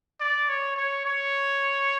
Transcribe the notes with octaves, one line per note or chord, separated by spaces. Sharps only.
D5
C#5
C#5
C#5